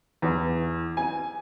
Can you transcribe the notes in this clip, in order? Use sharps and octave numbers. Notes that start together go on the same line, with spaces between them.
E2
G#5